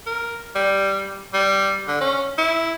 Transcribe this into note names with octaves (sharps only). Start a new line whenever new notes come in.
A#4
G3
G3
D3
C#4
E4